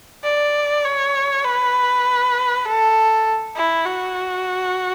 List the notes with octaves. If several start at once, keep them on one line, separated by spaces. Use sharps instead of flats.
D5
C#5
B4
A4
E4
F#4